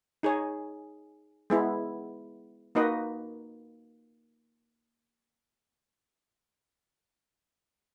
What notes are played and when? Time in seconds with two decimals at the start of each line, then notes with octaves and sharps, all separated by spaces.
0.23 D#4 G#4 C#5
1.50 G#3 B3 E4
2.75 A#3 D#4 F#4 B4 D#5